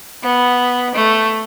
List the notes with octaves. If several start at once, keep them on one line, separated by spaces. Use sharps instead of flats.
B3
A3